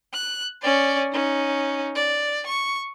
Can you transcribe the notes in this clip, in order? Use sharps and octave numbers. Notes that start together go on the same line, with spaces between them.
F#6
C#4 D5
C#4 D#4
D5
C#6